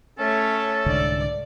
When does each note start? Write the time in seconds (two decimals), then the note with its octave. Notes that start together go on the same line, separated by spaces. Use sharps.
0.19 A3 C#4 A4 C#5
0.86 C2 G#2 D3 D5